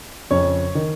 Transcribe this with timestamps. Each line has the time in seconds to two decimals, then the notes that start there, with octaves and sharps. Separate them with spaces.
0.31 F2 C#3 C#5
0.75 D#3